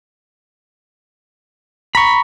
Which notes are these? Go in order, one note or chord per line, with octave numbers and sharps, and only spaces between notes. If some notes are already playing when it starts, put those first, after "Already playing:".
A#5 B5 C#6